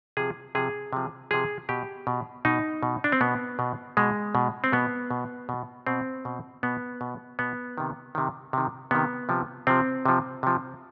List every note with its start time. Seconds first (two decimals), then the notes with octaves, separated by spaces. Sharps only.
0.17 C3 F3 G#4
0.55 C3 F3 G#4
0.93 C3 F3
1.31 C3 F3 G#4
1.69 B2 G4
2.07 B2
2.45 B2 D#4
2.83 B2
3.04 D4
3.12 C4
3.21 B2 B3
3.59 B2
3.97 B2 G#3
4.35 B2
4.64 C4
4.72 B2 B3
5.11 B2
5.49 B2
5.87 B2 C4
6.25 B2
6.63 B2 B3
7.01 B2
7.39 B2 B3
7.78 C3 D#3
8.15 C3 D#3
8.53 C3 D#3
8.91 C3 D#3 B3
9.29 C3 F3
9.67 C3 F3 C4
10.05 C3 F3
10.43 C3 F3